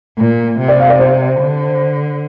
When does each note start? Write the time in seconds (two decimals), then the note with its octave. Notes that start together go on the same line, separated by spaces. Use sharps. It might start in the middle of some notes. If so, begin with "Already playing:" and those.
0.18 A#2
0.59 C3
0.68 D5
0.80 F5
0.89 D5
0.99 C5
1.40 D3